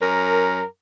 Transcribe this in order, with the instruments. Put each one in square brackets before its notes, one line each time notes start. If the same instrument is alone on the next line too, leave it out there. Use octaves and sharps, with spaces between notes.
[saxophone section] F#2 A#4